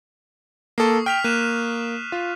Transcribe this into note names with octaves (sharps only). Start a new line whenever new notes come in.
A#3 A4 C#6 D#6 C7
G5 F6 B6 F7
A#3 F#6 D#7 E7
F4